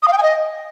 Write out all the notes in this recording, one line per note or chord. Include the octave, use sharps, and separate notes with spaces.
D#6
F5
G5
G#5
D#5